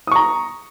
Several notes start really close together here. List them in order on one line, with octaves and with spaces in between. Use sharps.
D#6 C#6 A#5